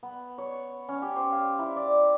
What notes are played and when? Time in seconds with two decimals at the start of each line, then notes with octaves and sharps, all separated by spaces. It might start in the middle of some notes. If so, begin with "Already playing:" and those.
0.03 B3
0.38 C#5
0.88 C#4
1.02 G4
1.16 C5
1.32 F5
1.59 E4
1.76 D5